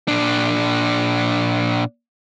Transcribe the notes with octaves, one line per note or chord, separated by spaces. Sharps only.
A#2 D4